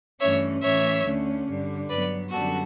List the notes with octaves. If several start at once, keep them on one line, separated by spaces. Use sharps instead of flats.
G2 E3 A3 C#4 C#5 E5
A2 E3 A3 C#4 C#5 E5
D2 D3 A3 C#4
G2 D3 G3
G2 F#3 B3 B4 D5
F#2 D3 G3 B3 F#4 A4